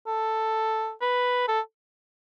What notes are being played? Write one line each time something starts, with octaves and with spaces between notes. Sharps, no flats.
A4
B4
A4